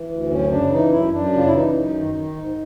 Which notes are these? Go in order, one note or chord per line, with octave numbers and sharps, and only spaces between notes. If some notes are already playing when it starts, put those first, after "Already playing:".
Already playing: E3
D2
F#2 C#4
C#3 D4
E3 D#4
F#2 E4
F#2 D4
C#3 F4
E4
E3 D#4
F#2
D#3
D#3
G#2